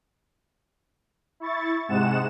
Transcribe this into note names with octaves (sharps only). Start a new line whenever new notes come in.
E4 C#6 A6
G#2 C3 G#3 F#5 E7